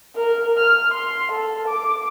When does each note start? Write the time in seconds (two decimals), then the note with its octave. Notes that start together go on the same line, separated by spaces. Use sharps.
0.16 A#4
0.58 F6
0.94 C6
1.32 A4
1.68 D6